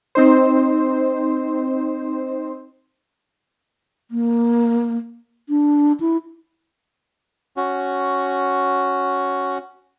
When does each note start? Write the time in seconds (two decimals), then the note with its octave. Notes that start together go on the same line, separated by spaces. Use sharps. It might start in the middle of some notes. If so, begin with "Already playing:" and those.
0.15 C4 D#4 C5
4.11 A#3
5.49 D4
6.00 E4
7.57 C#4 F#4